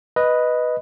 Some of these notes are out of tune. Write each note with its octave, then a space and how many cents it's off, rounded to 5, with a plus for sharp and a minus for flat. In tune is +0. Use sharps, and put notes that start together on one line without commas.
B4 +0 D#5 +0